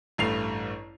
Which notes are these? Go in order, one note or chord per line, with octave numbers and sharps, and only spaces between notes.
A1 G2 A3 C7 F7